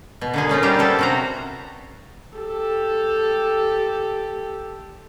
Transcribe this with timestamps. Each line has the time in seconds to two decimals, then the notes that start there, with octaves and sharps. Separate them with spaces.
0.21 B2
0.34 D3 A#3 G#4
0.49 A#2 C#4 D#4 F4
0.63 G3 D4 G4 A#5
0.79 B3 C#4 A4 C5
0.99 C3 F#4 A#5
2.37 G4 A4